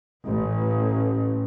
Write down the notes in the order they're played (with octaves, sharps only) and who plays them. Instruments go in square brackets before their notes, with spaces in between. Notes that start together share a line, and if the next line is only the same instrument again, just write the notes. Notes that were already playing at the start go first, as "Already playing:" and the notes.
[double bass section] A1